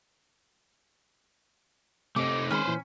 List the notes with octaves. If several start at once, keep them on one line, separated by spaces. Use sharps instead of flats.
C3 A3 D#4 D6
D#3 G#3 C4 C#4 B4 C5 B5
A#2 E3